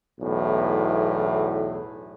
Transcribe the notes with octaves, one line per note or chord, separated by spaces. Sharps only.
B1 E2 A2